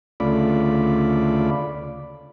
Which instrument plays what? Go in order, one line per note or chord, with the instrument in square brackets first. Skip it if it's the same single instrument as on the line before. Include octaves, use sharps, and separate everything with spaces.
[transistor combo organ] D2 C#3 A3 F4 D5 B5